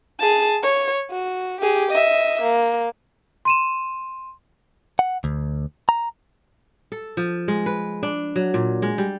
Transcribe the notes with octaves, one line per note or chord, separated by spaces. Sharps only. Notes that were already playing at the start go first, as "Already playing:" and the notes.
G#4 A5
C#5
F#4
G4 G#4
D#5 E5
A#3
C6 D#7 E7
F#5
D2
A#5
A4
F3
G#3
B4
D4
F#3
A#2
G#3
G3